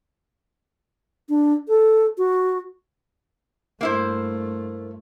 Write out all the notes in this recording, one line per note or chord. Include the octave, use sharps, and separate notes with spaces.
D4
A4
F#4
G2 A3 A#3 E4 C5